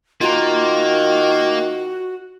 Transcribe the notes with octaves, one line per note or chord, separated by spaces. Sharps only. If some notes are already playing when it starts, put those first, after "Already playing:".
D#3 A#3 F4 F#4 A#5